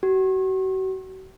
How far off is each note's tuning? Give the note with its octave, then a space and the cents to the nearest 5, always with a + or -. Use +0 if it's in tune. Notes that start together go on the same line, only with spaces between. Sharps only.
F#4 +40